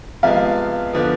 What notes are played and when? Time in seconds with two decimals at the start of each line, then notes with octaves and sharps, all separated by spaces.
0.23 C3 F3 G#3 B3 F5
0.93 D3 F3 B3